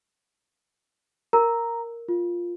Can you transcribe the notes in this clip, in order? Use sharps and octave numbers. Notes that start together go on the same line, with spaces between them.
A#4 A#5
F4